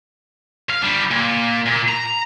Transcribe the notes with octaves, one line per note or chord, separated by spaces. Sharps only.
F5
D3 G3
A#2
A#2
A#5